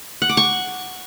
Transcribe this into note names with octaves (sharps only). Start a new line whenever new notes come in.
F#5
D6
C#6